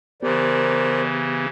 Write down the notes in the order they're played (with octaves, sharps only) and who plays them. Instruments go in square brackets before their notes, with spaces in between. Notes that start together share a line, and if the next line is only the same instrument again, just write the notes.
[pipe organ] C#3 E3 [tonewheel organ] B3 G4 [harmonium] A#4 C5 D5